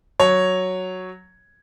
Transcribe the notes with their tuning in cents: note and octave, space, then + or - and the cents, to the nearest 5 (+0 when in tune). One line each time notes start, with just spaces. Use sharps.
F#3 +0 C#5 +0